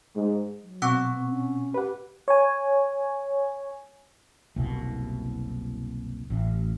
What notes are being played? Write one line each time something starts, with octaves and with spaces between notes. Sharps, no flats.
G#2
F#3
B2 C4 F#5 C#6 E6
B3
C#4
G4 B4 F#5
C#5 G#5
F#1 C2 B2
A1